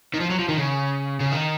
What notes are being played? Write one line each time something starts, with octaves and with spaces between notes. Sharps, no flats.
D#3
F3
F#3
F3
D#3
C#3
C#3
D#3